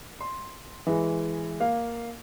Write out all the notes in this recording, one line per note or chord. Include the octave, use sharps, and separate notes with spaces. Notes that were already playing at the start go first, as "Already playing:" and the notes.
C6
E3 G#3
A#3 F5